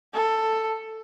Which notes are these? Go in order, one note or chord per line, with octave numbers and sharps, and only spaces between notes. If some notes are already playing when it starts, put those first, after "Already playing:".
A4